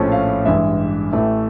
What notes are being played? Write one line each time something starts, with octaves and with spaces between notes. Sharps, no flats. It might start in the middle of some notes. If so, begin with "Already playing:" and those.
Already playing: A#1 A2 F3 A3 C#4
F5
A1 G2 E3 G#3 E5
A1 A2 E3 A3